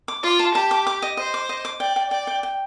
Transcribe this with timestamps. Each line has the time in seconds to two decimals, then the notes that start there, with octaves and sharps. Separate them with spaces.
0.08 D6
0.23 F4 D6
0.39 A5
0.54 G4 A5
0.71 D6
0.87 D6
1.02 D#5
1.17 C5 D#5
1.34 D6
1.49 D#5
1.65 D6
1.80 D5 G5
1.96 G5
2.11 D5 G5
2.27 G5
2.43 G5